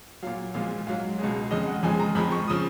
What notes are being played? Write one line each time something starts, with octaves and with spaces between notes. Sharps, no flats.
A#2 F#3 F5
A#2 F3 G#3 F5
G#2 F#3 F5
C#2 B2 G#3
F2 C#3 G#3 D#5
F#5
F2 C#3 F3 G#3 G#5
A#5
F2 F3 G#3 B5
C#6
C#3 F3 D#6